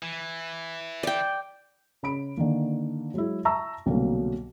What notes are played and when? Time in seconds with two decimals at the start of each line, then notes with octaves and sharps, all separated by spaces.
0.03 E3
1.03 D5 G5
2.03 C#3 B5 D7
2.37 D3 D#3 A#3
3.14 F#3 G#3 E4
3.45 E5 A5 A#5 C#6 E6
3.86 C2 B2 D3 F#3 A3 A#3